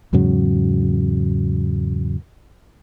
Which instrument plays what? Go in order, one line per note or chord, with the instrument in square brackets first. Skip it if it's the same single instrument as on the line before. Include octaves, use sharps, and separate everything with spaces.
[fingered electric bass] E2 G#2 C#3 F#3